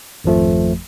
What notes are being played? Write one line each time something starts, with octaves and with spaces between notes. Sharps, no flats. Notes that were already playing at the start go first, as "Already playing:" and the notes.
G#1 F2 F3 A3